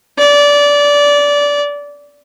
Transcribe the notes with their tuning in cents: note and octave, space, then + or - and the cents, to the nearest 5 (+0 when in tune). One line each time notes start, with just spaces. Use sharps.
D5 -20